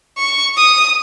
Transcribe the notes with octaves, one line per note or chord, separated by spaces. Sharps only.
C#6
D#6